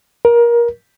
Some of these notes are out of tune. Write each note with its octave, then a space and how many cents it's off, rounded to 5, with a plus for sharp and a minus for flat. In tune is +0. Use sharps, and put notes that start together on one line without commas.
A#4 +25